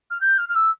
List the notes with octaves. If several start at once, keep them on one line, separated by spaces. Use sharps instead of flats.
F6
G6
F6
F6
E6